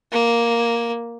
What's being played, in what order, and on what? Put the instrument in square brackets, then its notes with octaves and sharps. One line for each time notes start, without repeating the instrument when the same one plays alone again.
[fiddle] A#3